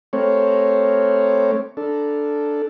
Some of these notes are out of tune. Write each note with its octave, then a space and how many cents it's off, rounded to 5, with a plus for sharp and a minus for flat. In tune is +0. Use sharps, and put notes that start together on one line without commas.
A3 +0 C4 +0 C#5 +0
D4 +0 A4 +0